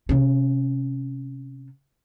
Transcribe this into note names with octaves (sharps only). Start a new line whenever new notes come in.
C3 C#4